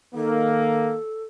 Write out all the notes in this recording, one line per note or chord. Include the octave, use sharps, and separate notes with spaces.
D#3 A#3 A4